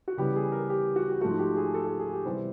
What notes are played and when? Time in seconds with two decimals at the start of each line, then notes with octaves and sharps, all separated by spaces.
0.08 F#4
0.17 C#3 E3 G3 B3 G4
0.36 G#4
0.52 A#4
0.70 G4
0.96 F#4
1.11 G4
1.21 G#2 F3 A3 F#4
1.39 G4
1.57 G#4
1.74 A4
1.87 G#4
1.99 G#4
2.13 G4
2.25 C3 E3 G3 B3 C5